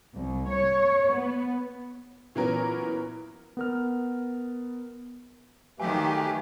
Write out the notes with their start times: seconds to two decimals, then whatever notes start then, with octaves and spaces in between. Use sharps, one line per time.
0.16 C2
0.50 C#5
1.11 B3
2.35 A#2 E3 F#3 B3 C#4 A#4
3.57 B3 A#4 F6
5.80 D#3 F#3 A3 G4 B4 E5 F5 G#5